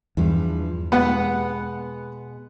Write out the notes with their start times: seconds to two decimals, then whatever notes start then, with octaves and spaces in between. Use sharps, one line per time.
0.17 E2 G2 E3 F3
0.92 B2 G#3 B3 G4 F#5